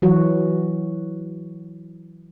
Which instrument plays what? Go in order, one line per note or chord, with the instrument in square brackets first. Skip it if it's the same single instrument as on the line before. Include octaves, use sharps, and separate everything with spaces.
[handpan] E3 F#3 F#4